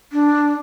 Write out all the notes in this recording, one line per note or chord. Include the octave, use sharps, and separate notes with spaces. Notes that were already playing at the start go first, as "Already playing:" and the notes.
D4